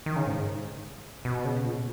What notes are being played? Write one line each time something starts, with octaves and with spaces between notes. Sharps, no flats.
D#3
C#3
G#2
B2
C#3
A#2